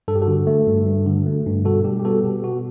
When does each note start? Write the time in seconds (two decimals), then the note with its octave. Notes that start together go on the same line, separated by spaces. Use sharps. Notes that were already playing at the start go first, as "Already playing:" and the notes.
0.08 G2 A4
0.15 G4
0.22 F#4 A4
0.27 D3
0.47 A3
0.67 G2
0.86 G2
1.07 D3
1.26 A3
1.46 G2
1.65 B2 F#4 A4
1.84 G3 G4
2.00 G4
2.05 B3 F#4 A4
2.24 B2 G4
2.43 B2 F#4